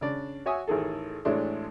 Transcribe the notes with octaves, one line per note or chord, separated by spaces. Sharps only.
C#3 D4 D5
F#4 C#5 E5 G#5 D#6
A1 D#3 G#4 A4
A1 A2 G#3 A3 D4